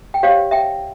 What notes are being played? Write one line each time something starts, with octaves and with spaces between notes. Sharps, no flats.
G5
G4 C5 C#5 F5
E5 G5